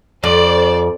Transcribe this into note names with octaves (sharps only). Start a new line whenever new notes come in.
F2 C5 D5